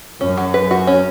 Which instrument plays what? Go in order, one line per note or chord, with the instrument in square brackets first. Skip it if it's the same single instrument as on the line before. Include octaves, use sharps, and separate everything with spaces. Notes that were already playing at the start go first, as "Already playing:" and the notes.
[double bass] F#2 [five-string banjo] C#4
[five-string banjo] F#3
B4
F#4
C#4